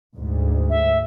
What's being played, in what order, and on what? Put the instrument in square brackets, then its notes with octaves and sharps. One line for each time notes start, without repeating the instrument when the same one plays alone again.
[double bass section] D2 G#2
[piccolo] E5